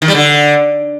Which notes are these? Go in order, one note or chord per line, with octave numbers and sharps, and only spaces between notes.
D#3
G3
D3